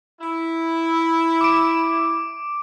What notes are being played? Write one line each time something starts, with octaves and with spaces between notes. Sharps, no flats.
E4
D6 D7